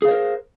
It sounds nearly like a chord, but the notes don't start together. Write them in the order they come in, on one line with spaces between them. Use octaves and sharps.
G#4 F5 C5 A#4